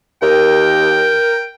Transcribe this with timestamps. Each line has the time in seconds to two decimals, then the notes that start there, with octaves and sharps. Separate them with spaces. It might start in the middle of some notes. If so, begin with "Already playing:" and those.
0.22 D#2 A#4 G5